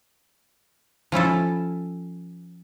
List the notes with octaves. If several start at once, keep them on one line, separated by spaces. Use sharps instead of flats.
F3 C#4 E4 A4